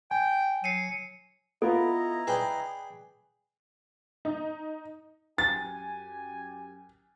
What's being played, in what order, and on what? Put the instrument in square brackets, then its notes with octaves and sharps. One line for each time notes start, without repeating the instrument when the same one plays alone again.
[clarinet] G5 [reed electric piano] G#5
[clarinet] F#3 [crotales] C7 C#7 D#7
[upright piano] B3 F4 [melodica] E4 D#5 A#5 [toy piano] A4
[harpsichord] G#4 D5 G5 [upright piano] B4
[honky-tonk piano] D#4
[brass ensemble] F#2 G4 G#5 [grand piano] A6